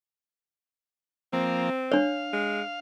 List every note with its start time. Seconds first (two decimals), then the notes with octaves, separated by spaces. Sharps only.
1.33 F3 A#3 C4
1.92 D4 C#5 F5
2.33 G#3